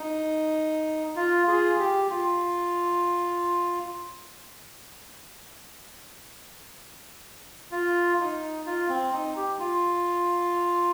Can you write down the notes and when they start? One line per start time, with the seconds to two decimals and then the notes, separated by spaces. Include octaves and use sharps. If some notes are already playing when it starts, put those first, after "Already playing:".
Already playing: D#4
1.16 F4
1.47 F4 G#4
1.79 G4
2.10 F4
7.71 F4
8.19 D#4
8.66 F4
8.89 C4
9.13 D#4
9.36 G4
9.59 F4